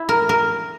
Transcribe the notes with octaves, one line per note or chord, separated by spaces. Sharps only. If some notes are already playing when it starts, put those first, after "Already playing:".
Already playing: E4
A#4
A#4